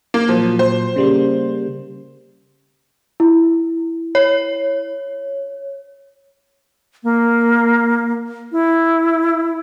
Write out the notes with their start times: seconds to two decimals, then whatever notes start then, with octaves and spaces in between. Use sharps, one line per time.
0.14 A#3
0.29 A#2 F3 F#3
0.59 C5
0.96 C#3 G3 A#3
3.20 E4
4.15 C#5
7.03 A#3
8.52 E4